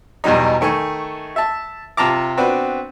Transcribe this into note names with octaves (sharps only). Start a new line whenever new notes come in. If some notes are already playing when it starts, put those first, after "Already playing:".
E2 B2 F#3 G3 D#4
D#3 A3 G#5 C#6
E5 A5
C3 F4 A5 A#5 D6
B3 C4 D4 F#4 B4